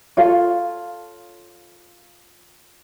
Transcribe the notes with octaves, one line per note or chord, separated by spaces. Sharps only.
F4 A4 C#5 F5